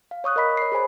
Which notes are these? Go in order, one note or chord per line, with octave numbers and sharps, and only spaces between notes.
F5
C#5 C#6 D#6 F#6
A#4 D#5 B5 B6
C#5 C7
G#4 C5 G#5 B5